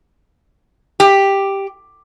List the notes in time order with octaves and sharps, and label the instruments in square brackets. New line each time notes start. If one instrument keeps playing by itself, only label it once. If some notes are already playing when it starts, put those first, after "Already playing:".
[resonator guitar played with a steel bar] G4